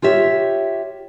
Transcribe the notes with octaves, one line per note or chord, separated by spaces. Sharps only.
F4 G4 C#5 E5